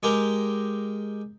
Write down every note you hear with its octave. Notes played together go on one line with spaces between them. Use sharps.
G#3 G4 A#4